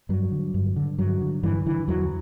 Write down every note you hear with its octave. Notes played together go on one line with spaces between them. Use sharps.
G2 F#3
D3
G2
D3
G2 F#3
D3
G2 E3
D3 E3
E2 F#3